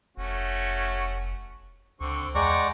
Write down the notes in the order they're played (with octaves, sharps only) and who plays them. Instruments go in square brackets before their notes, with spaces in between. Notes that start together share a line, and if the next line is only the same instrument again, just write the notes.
[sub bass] F1 [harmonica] A3 C#4 F#4
[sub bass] C#2 [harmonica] D3 C4 C#6
[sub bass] E2 [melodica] G#3 D5 C#6 [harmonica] F#5 G5 A#5